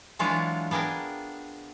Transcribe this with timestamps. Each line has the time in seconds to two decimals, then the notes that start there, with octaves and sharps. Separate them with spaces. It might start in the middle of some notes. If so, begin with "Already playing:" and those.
0.19 E3 F#3 G#3 D4 F4
0.71 B3 D4 G#4 A#4 G5